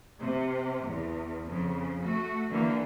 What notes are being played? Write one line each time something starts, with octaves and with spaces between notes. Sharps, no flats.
C3
E2
F2 C#3
A3 F#4
D3 E3 A#3